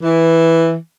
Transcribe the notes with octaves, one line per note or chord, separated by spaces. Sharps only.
E3